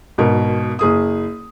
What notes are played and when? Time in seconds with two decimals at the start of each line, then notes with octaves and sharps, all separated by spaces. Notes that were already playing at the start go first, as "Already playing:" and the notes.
0.18 G#1 B2 A#4
0.79 F#1 G#4 D#6